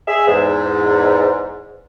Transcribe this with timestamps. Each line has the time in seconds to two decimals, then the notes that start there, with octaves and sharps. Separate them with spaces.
0.08 G#4 E5
0.27 E2 G#2